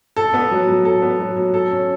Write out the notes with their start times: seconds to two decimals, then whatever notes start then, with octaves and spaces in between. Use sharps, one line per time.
0.16 A4
0.34 B3
0.51 F#3
0.67 F#3
0.85 A4
1.02 B3
1.19 F#3
1.36 F#3
1.54 A4
1.71 C#4